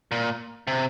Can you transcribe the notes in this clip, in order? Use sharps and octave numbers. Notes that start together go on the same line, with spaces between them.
A#2
C3